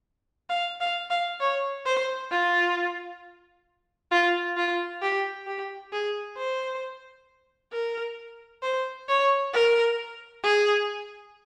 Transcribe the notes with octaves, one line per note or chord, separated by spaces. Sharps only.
F5
F5
F5
C#5
C5
F4
F4
F4
G4
G4
G#4
C5
A#4
C5
C#5
A#4
G#4